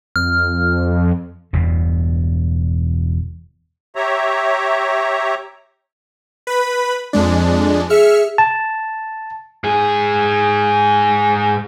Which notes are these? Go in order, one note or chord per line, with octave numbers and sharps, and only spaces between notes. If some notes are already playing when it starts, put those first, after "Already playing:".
F2 F6
E1 E2 G2 B2
G4 C#5 E5 A#5
B4 B5
F2 G#3 D4
G#4 E5 F6 C#7
A5
G#2 G#4